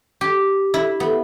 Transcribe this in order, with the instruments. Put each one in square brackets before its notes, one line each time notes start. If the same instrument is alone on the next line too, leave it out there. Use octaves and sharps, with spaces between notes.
[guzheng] G4
E4
B3